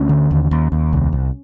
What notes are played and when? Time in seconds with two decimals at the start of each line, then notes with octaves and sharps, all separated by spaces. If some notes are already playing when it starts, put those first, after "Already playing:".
Already playing: D2 C#4
0.09 D3
0.31 D#2
0.51 D#2
0.72 D#2
0.93 C2
1.13 C2